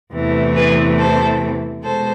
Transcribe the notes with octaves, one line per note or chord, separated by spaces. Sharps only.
E2 C3 E3 A3
G#4 B4
A4 C5
B2 G#3 A4 C5